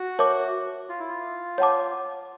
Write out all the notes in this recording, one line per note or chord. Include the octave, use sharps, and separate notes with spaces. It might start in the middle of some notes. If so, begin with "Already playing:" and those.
Already playing: F#4
A#4 C#5 E5 A5 D6
F4
E4
F4
C#5 F#5 A5 D6